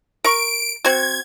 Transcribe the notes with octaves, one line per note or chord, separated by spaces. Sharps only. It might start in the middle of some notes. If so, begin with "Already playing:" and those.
A#4 C#6 D7
C4 F#4 G#6